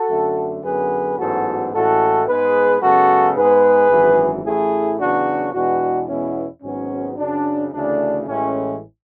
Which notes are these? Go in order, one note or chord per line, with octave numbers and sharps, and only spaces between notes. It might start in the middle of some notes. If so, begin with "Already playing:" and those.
Already playing: F#4 A4
F#2 D3 A3
F#2 D3 F#3 B3 G#4 B4
A1 G#2 F#3 B3 F#4 A4
A1 A2 G#3 F#4 A4
G#2 G#3 B3 G#4 B4
F#2 C#3 G#3 B3 F#4 A4
G#2 G#3 B3 G#4 B4
G#1 F#2 E3
A1 A2 E3 A3 E4 G#4
E2 C#3 F#3 B3 D4 F#4
E2 B2 G#3 B3 D4 F#4
E2 B2 G#3 B3 C#4 E4
G#1 G#2 F#3 B3 C#4
F#2 C#3 F#3 D4
D2 C#3 E3 A3 D4
A1 A2 E3 G#3 C#4